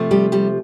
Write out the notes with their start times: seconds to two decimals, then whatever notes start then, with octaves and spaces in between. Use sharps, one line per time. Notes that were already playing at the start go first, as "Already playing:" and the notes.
Already playing: C3 F3 A3 C4
0.11 G3 G4
0.32 G3 G4